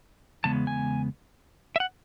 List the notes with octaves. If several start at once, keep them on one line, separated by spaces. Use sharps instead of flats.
E2 C#3 G#3 B3 A5
G#5
E5
F#5